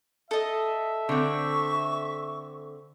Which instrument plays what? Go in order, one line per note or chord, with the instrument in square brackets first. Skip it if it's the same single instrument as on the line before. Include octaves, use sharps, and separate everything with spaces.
[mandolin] A4 D#5 [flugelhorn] E5
[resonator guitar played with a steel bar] D3 C4 [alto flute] C#6